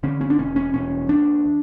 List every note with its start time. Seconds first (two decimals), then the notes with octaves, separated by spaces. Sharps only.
0.03 D3 C#4
0.21 C#4
0.30 D4
0.38 E1 C#4
0.56 C#4
0.74 E1 C#4
1.09 D#2 D4